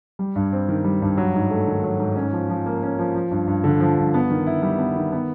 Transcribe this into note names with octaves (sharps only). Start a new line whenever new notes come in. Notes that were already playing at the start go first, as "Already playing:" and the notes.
G3
G2
C4
D#3
G3
G2
F#3
G#2
A3
D#3
F#3
G#2
C#4
F3
F3
A#3
C#4
F3
F3
G2
G2
D3
F3
G2
B3
D#3
E4
G3
B3
D#3
B3